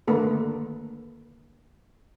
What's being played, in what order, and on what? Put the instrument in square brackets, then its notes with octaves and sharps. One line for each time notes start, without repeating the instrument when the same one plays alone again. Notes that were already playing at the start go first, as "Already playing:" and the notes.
[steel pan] D3 D#3 A3 A#3 A4 B4